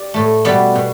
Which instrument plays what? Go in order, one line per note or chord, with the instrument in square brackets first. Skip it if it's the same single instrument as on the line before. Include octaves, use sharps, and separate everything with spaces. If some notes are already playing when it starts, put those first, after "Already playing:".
Already playing: [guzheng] G4 D5
A2 A3
B2 G3 B3 D5
B2